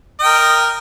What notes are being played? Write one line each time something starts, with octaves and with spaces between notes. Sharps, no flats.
A#4 D#5 G5